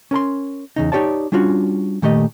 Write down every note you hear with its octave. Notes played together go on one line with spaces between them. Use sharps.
C#4 A#4 A#5 C6
E2 C#3 D#4
D#4 E4 G4 C#5 D5 A5
G3 C#4 D4 F4 F#4
A#2 D#3 A3 G4 D#5